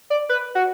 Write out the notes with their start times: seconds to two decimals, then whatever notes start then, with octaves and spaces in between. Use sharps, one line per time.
0.10 D5
0.29 B4
0.55 F#4